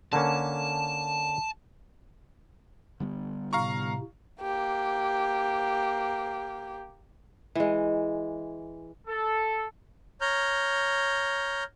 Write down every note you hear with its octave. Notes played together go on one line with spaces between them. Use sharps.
D3 A#3 C#4 A5
D3 G3 B3
A2 C3 F5 A#5 C#6
A#3 G4
E3 G#3
A4
C#5 A#5 F6 G6